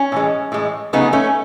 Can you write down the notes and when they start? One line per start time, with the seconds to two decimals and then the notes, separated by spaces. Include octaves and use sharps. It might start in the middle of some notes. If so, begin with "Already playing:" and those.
Already playing: C#4
0.12 A2 E3 G#3
0.52 A2 E3 G#3
0.93 C#3 F#3 A3 B3 D#4
1.13 A3 C#4